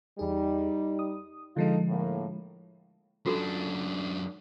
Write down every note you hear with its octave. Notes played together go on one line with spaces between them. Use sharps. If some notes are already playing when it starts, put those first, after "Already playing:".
E2 G3 D#4 G#4
D#6
D3 F3 G#3 D#4 F4 A4
A2 A#3
F#2 D4 F4 F#4 A4